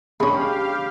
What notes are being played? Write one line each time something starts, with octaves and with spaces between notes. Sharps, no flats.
G#3 C#4 D4 G4 F5 B5